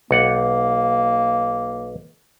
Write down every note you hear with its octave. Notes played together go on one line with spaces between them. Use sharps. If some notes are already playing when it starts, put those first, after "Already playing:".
B1 A#3 F#5